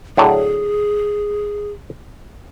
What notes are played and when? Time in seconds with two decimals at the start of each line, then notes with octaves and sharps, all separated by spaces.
0.17 A2 D3 F#3 G#4